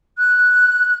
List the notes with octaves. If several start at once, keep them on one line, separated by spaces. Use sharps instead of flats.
F#6